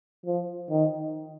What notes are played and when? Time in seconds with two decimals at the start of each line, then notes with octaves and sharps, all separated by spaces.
0.26 F3
0.70 D#3